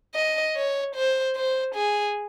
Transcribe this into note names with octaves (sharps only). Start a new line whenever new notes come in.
D#5
C#5
C5
C5
G#4